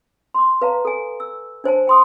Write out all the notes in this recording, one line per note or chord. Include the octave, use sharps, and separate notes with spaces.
C6 D6
B4 F5 A5 A#5
A4 G#5
E6
D4 C5 G#5 A5
G5 C6 D#6